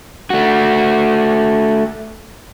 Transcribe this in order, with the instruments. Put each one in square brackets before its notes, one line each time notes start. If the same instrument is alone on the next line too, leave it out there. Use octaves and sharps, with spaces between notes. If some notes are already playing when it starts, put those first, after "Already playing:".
[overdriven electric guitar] A3 F#4